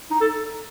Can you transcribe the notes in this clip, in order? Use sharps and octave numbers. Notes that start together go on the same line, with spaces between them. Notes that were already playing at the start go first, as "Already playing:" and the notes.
D#4
A4